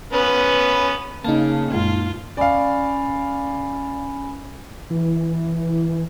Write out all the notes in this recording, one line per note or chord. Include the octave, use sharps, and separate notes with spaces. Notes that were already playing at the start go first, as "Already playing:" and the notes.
B3 C#4 B4
C#3 A#3 D#4 A5
F#2 A#2 G#3 F4
C#4 D5 F5 G#5 B5
E3